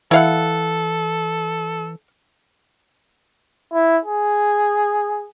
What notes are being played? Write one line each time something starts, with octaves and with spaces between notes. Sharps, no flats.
E3 E4 A4 F5 F#5
E4
G#4